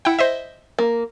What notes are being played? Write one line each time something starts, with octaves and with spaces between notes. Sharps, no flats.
E4 F#5 G5
C5 D#5 E5
A#3